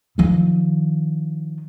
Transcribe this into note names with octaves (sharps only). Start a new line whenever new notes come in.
D#3 F3